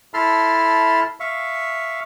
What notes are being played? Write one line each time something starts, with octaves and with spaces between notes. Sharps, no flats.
E4 A4 A5 B5 C6 F6
E5 F5 C#6